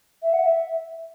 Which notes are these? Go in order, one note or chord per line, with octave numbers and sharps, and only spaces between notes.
E5
F#5
E5